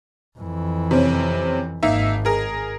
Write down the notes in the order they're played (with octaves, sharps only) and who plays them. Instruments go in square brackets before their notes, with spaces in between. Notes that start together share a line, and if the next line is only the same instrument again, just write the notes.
[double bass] F2 E3
[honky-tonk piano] C3 C4 C#4
[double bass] G#1 G#2 [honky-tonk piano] A#3 D#4 E5
[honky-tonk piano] G#4 A#4